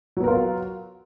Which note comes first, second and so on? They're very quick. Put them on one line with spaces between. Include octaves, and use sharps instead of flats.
F#3 B3 A#4 F4